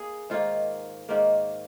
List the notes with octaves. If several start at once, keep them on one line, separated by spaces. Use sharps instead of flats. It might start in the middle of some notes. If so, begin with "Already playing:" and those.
Already playing: A#3 G#4
G#2 D#3 A#3 F4
G#2 D#3 A#3